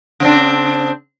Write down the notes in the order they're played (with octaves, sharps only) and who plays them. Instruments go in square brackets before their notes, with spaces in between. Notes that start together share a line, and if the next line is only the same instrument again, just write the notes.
[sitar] C#3 C4 D4